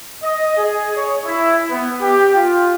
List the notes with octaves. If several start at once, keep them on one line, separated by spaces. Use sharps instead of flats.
D#5
G#4
C#5
E4
B3
G4
F4